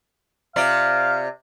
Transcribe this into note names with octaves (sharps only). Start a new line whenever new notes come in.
C3 F4 D5 F5